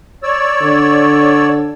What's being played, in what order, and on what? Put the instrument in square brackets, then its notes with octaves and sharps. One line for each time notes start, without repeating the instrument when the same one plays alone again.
[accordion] C#5 D5 E6
[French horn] D3